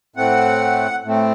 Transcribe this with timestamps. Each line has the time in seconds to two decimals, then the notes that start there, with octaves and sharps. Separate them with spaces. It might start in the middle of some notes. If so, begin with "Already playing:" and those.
0.16 A2 A3 C4 F#5
1.04 A2 A3 C4